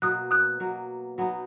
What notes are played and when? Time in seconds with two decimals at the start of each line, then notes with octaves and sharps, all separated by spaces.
0.02 B2 F#3 A#3 D#6 F#6
0.31 D#6 F#6
0.60 B2 F#3 A#3
1.18 F#3 B3 D#4